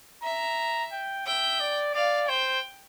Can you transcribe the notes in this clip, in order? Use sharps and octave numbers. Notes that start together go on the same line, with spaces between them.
E5 A#5
G5
E5 G5
D5
D5 F5
C5 G5